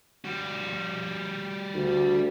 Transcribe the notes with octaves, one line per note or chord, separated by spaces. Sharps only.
G3 F#4
D2